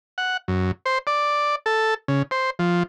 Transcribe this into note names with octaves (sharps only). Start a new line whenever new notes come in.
F#5
F#2
C5
D5
A4
C#3
C5
F3